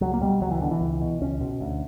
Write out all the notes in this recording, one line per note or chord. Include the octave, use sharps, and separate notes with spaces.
C#2 F#3
A#3
B2 G3
C#2 F#3
E3
B2 D3
E3
C#2
B2
C#2 C#4
B2
D2